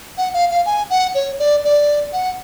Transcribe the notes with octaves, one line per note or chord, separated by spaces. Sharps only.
F#5
F5
F5
G#5
F#5
C#5
D5
D5
F#5